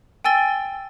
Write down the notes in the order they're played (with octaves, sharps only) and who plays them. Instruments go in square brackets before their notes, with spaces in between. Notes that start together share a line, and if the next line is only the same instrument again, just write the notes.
[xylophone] G5 G#5 E6 A6 G7